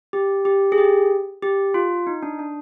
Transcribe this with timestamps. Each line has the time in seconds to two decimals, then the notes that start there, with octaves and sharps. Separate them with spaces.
0.13 G4
0.45 G4
0.72 G#4
0.78 G4
1.43 G4
1.74 F4
2.07 D#4
2.23 D4
2.39 D4